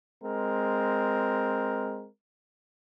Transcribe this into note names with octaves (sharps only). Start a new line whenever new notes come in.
G#3 C4 A#4